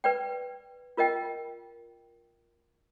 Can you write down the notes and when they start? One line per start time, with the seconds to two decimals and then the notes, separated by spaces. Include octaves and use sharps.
0.04 B4 D5 G5
0.97 F4 A#4 D#5 G5